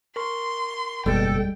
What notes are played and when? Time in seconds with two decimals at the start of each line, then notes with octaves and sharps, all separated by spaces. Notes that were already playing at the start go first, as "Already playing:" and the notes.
0.16 A#4 C6 C#6
1.06 F#1 E2 B2 G3 G#3 A4 G5